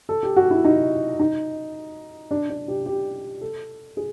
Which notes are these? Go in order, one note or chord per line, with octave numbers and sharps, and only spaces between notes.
A4
G4
F#4
E4
D#4
D#4
D4
D4
G4
G4
A4
G#4